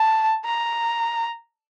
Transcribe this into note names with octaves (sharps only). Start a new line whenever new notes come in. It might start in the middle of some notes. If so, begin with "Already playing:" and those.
Already playing: A5
A#5